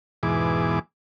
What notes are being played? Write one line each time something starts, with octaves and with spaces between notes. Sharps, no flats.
E2 G#2 B2 E3 G#4 D6